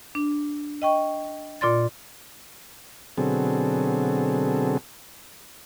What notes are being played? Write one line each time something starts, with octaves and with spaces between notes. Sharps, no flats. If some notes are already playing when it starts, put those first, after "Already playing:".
D4
D#5 G5 C#6
A#2 F4 D5 C6 A6
B2 D3 F#3 C4 G#4 A4